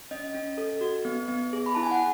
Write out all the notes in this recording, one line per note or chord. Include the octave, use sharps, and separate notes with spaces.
C#4 D#5
C#4
A4
F#4
B3
B3
G#4
B5
E4 A5
G#5
F#5